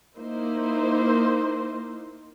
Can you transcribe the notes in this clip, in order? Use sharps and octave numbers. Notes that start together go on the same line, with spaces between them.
A#3 D#4 E4 C5